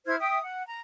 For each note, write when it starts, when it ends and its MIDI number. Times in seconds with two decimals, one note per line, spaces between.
0.06 0.15 64
0.06 0.15 72
0.06 0.15 89
0.06 0.15 92
0.20 0.40 76
0.20 0.40 79
0.20 0.40 87
0.41 0.65 78
0.66 0.80 82